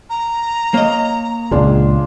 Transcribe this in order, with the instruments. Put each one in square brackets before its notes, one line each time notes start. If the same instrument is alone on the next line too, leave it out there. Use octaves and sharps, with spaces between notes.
[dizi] A#5
[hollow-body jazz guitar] A#3 D#5 [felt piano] C#5
[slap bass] C#2 A#2 C#3 [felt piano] D4 F4 G#4